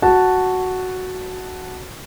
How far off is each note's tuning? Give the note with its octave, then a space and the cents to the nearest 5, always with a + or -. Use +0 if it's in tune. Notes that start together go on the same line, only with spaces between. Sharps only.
F#4 +0 F#5 +0 A5 +0